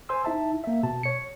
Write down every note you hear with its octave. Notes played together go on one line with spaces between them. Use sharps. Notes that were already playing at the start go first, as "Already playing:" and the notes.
C5 G#5 C6 E6
D#4 E4 E5 A5
A#3 E5
B2 A5
C#5 C#7